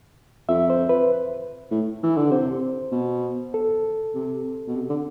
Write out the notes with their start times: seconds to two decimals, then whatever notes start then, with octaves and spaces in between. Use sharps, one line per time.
0.49 F2 E5
0.70 C5
0.89 B4
1.71 A2
2.03 E3
2.17 D3
2.31 C3 C5
2.92 B2
3.54 A4
4.15 C3
4.68 B2
4.75 C3
4.90 D3